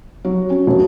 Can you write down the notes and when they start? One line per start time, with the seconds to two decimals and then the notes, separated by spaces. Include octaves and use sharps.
0.25 F#3
0.50 C#4
0.67 E1